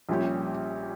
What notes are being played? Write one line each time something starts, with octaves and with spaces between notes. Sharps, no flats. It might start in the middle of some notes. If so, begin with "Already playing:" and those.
A#1 A#2 G3 C#4 G4